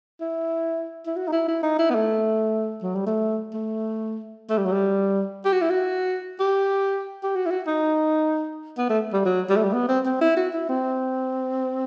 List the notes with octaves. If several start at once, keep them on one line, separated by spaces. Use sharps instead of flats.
E4
E4
F#4
D#4
E4
E4
D#4
E4
B3
A3
F#3
G3
A3
A3
A3
G3
F#3
G3
G4
F#4
E4
F#4
G4
G4
F#4
E4
F#4
D#4
B3
A3
G3
F#3
G3
A3
G3
B3
C4
C4
E4
F#4
E4
C4